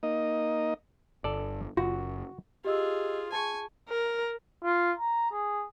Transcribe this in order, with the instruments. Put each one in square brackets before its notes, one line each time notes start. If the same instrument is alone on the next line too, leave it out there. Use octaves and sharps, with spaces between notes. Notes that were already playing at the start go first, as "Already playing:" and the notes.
[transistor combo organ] A#3 D#4 D#5
[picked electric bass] G1 [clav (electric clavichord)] A4 D5
[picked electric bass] F#1 [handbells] F4 [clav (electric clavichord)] F#4
[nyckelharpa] F4 G#4 [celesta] G4 D#5 E6
[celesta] G#4 A5 [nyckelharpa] G#5 C#6
[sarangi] A#4
[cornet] F4
A#5
G#4